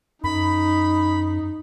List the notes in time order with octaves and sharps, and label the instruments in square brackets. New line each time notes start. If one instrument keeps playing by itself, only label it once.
[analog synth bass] F#2 [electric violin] D#4 [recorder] B5